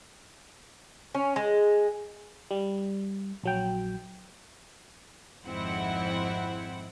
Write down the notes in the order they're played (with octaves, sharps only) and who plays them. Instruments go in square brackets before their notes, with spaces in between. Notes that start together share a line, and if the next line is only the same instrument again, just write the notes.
[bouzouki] C#4
G#3
[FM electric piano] G3
A#1 F#3 G5
[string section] G#1 F2 G#2 C4 E4 F#5